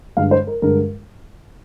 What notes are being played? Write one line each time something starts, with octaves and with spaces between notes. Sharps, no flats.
G2 D3 G#3 F5
C5
A#4
G2 D3 G#3 A#4